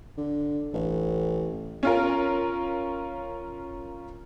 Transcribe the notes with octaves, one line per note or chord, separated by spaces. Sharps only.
D3
A1
C#4 F4 A#4